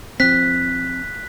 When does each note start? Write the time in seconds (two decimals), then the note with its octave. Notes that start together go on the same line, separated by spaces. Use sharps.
0.20 F3 C4 F#6 B6